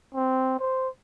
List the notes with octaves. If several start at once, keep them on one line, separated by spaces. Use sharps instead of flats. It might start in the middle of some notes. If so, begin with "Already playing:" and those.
C4
C5